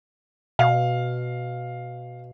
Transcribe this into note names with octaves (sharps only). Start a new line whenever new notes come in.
B2 F5